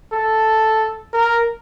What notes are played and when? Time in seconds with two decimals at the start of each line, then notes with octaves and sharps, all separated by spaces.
0.13 A4
1.13 A#4